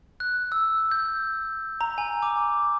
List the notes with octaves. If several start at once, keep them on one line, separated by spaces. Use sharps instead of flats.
F#6
E6
G6
A#5
G#5
D6